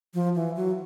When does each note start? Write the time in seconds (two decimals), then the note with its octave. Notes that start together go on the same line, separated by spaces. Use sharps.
0.14 F3
0.35 E3
0.56 F#3